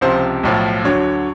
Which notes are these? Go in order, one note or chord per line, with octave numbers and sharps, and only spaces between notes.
C#2 C3 F3 C5
B1 A2 F3
D2 D3 F#3 C#5